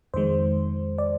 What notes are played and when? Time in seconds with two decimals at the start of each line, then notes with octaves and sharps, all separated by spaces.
0.14 F2 D#3 G#3 C5
0.98 D5